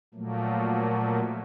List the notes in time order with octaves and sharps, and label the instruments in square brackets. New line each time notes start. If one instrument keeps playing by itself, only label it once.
[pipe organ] A#2 F3 F#3 A3 A#3